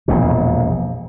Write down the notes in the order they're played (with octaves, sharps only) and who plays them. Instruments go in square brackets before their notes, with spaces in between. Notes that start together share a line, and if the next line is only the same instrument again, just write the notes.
[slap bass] E1 A#1 F2 A#2